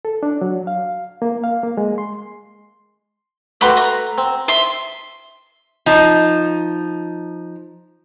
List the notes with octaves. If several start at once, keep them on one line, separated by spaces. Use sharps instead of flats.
A4
D4
F#3
F5
A#3
F5
A#3
G#3
C6
A3 F#4 G4 B4 B5 C6
A#5
C4
E5 C6
F3 D#4